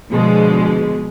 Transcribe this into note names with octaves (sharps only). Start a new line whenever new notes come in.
B2 D3 F3 G#3